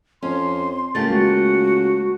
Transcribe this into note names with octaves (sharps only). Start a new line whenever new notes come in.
F2 C#4 C6
C#2 A3 A#3 G4 A6
G#3 F#4